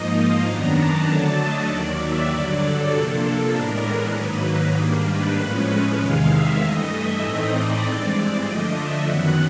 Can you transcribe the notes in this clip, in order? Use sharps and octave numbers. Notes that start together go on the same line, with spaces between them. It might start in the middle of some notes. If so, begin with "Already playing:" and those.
Already playing: G#2 F3 A#3 D#4 D#5
F5
F#2 D#3 F#3 B3 D4 A#5
A5
D3 F#3 A3 D4
D#5
D#2 D#3 F#3 D5
E5
G2 D3 F#3 D5
A4
C3 F3 A#3 D4
A2 E3 G#3 B3 D4 A#4
G#2 D#3 F#3 A#3 B4
B4
G#2 D#3 G3 A#3 D4
B4
A2 F3 G#3 C#4
E2 C3 D#3 G#3 F5
E5
G2 E3 A3 D#5
E5
A2 E3 A3 C4 D#4 D#5
D5
G2 E3 G#3 C4
D3 F3 A3 D4 D#5
E5
F#2 D#3 F#3 B3 F#5